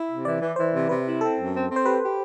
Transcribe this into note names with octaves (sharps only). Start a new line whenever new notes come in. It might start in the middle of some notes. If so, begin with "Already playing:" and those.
Already playing: E4 E5
C3
E3 D5
E3
E3 C5
C3
C3 B4
E4
C4 A4
F#2
C4
C4
C5
G4 B4
G4